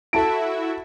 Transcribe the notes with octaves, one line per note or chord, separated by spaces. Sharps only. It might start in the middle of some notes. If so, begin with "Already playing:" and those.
E4 F#4 A4 E5 A5 D7